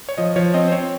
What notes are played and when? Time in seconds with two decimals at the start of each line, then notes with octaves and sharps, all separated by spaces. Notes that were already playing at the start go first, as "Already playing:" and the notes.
0.09 C#5
0.18 F3 D#5
0.36 F3 C#5
0.54 C4 D#5
0.68 C5
0.72 C4 C#5